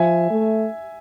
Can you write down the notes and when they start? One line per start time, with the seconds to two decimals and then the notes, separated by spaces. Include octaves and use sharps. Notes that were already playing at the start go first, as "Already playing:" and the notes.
Already playing: F3 E5 G#5
0.30 A3